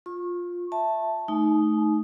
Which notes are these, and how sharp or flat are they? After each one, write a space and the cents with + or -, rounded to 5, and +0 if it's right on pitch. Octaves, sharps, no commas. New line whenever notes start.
F4 +10 C#6 -30
E5 +0 A5 +0
A3 -10 D#4 +0 G#5 +45